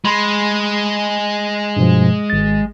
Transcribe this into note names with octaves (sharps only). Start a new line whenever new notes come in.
G#3 B5 C6
G2 B2 F3
G#1 A6